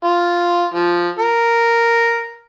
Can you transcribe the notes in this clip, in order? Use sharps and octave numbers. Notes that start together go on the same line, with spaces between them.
F4
F3
A#4